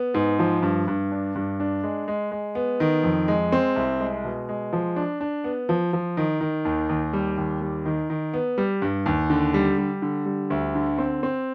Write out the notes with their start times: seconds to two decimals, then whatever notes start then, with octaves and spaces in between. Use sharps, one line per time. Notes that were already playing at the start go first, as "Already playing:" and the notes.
Already playing: B3
0.14 G#2
0.39 F3
0.62 G2
0.88 G2
1.11 D4
1.35 G2
1.60 D4
1.83 G#3
2.08 G#3
2.32 G#3
2.55 B3
2.80 D#3
3.04 F2
3.28 G#3
3.52 C4
3.76 C2
4.00 G#3
4.24 B2
4.49 G#3
4.73 F3
4.96 D4
5.21 D4
5.44 B3
5.69 F3
5.93 F3
6.17 D#3
6.41 D#3
6.65 D#2
6.89 D#2
7.13 G3
7.37 D#2
7.62 G3
7.85 D#3
8.10 D#3
8.33 B3
8.58 G3
8.82 G2
9.06 D#2
9.30 D3
9.54 G3
9.78 G3
10.02 D3
10.26 G3
10.50 D2
10.75 D3
10.98 C4
11.23 C4